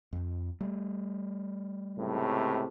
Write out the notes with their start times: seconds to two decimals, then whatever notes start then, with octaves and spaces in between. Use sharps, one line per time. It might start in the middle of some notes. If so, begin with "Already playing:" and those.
0.13 F2
0.61 G3 A3
1.98 C#2 A2 C3